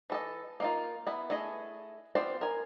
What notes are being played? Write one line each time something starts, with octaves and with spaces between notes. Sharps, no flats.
E3 A4 D#5
A#3 D#4 F4
B3 E4
A3 E4 G#4 D#5
B3 C4 F4 C5 D5
A#4 G#5